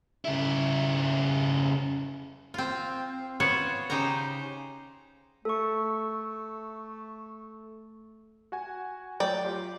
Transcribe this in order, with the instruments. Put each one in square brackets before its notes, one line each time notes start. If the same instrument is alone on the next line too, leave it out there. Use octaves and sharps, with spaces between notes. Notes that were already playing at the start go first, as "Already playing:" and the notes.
[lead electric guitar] C#3 E4
[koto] C4 F4
B3 F4 C5 C#5 F#5
C#3 D#4 G4 C5 A#5
[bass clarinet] A3 [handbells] A4 C#6
[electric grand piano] F#4 F#5 G#5
[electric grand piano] F#3 A3 C#5 [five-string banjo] D5 G5
[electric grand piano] F4 G4